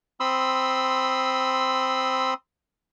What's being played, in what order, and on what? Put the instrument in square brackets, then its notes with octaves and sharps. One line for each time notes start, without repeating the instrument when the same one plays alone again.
[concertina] C4 B5 C6 D#6 E6